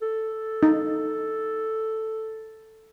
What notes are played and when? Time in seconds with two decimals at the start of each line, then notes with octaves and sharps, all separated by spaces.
0.02 A4
0.63 D#4